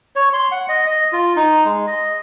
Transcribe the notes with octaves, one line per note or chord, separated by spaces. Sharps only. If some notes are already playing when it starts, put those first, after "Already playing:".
C#5
C6
F#5
D#5
D#5
F4
D#4
G#3
D#5